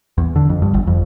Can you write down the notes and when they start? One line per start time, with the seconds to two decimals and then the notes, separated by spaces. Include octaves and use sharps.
0.18 E2
0.36 D3
0.49 F2
0.62 G2
0.74 G1
0.87 F2